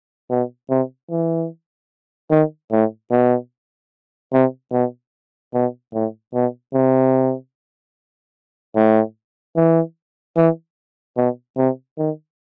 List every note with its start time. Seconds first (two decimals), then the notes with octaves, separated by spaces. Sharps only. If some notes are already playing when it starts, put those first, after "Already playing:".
0.30 B2
0.70 C3
1.11 E3
2.30 D#3
2.72 A2
3.11 B2
4.33 C3
4.72 B2
5.54 B2
5.94 A2
6.34 B2
6.74 C3
8.76 A2
9.56 E3
10.36 E3
11.16 B2
11.57 C3
11.98 D#3